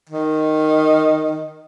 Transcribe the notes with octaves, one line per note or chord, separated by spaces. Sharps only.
D#3